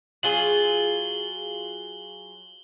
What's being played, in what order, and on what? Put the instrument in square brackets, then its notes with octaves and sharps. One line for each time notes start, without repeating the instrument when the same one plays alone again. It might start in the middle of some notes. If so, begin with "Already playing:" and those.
[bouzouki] F#3 F4 G#4 [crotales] F#7 G7